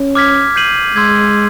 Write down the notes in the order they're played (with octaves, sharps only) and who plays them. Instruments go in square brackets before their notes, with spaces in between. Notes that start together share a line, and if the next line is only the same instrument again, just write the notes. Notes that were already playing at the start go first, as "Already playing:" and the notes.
Already playing: [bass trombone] C#4
[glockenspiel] D6 F6 G#6 B6
G6 C7 D#7 F#7
[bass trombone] G#3 [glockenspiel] C6 E6 G#6